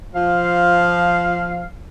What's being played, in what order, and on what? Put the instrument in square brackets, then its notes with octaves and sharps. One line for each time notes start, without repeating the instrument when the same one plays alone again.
[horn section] F3 F5